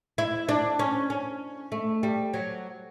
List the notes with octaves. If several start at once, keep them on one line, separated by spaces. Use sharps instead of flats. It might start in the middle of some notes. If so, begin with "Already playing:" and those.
E4
D4
C#4
C#4
A3
G3
F#3